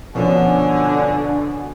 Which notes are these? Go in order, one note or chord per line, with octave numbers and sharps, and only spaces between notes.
B2 D3 F3 C#4 G#5